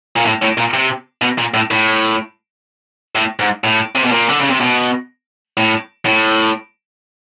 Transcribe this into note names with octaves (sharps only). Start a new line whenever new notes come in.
A#2
A2
A2
A#2
C3
B2
A#2
A2
A2
A2
G#2
A2
C3
B2
A#2
D3
C#3
C3
B2
A2
A2